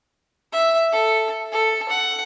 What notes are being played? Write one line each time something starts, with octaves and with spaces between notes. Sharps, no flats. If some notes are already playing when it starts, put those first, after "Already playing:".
E5
A4
A4
F#5